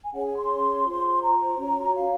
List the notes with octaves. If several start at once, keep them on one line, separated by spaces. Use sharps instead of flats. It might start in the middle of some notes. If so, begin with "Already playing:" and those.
G#5
C#4 G#4 C#5 F#5
G#5
C6
F4 C5
A#5
C#4 F#4 C#5
F5